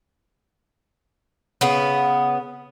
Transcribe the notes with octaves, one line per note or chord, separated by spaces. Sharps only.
C#3 B3